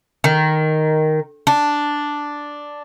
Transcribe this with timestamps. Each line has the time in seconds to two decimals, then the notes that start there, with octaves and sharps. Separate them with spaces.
0.24 D#3
1.47 D4